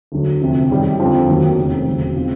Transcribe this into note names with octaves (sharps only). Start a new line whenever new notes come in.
D2 D3 F#3
D2 C3 F3
F#2 D#3 G3
F2 D3 F3
D#2 D#3 F#3 A#3
F1 F2 C#3
E1 D2 C#3 F#3
B2 G#3 C4 F4